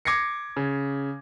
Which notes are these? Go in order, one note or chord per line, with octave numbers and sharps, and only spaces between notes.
D6 G#6 A#6 C7 C#7
C#3